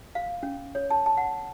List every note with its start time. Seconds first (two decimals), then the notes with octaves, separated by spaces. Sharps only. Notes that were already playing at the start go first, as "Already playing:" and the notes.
0.15 F5
0.43 C#4
0.75 C#5
0.90 A5
1.06 A5
1.17 F#5